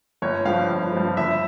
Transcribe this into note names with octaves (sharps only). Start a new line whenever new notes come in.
G1 C#5
G2 F3 F5
G1
G2 F3
G1 E5